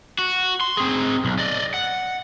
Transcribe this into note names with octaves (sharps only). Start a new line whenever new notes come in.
F#4
C6
C4 G#4
B1
D5 D#5
F#5